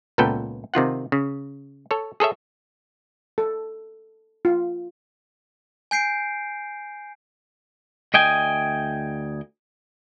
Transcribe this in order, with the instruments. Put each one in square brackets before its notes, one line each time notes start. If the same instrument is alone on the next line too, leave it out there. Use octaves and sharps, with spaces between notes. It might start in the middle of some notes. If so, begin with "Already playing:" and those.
[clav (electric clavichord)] C#2 A#2 B3 A4 B4 G5
C3 D#3 F4 F#5
C#3
A4 C#5
G#4 A4 C#5 E5
[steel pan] A4
F4
[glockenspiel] G#5 G6 C7 D7
[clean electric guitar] D2 D#5 G5 G#5